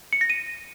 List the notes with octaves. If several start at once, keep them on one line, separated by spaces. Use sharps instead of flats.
C#7
A#6
D#7